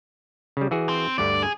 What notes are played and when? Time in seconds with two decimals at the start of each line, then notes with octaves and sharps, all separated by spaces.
0.57 C#3 G3
0.71 E3 F#4 G#4
0.89 C4
1.18 D2 G2 D3 D5
1.43 G#4